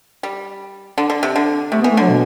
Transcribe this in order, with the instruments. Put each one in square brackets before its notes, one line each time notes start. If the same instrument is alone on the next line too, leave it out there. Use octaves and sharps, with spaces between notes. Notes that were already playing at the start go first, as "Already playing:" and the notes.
[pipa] G3
D3
D3
C3
D3
[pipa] C3 [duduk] A3
[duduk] B3
[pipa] E3
[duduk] A3
[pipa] D3 [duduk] F#3
[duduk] B2